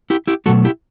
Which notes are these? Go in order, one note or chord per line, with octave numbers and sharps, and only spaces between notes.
E4 G4
E4 G4
B2 F#3 A3 F#4 A4
E4 G4